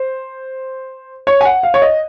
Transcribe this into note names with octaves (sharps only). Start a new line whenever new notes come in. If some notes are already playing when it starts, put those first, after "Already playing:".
Already playing: C5
C#5
G#5
F#5
F5
C#5
D#5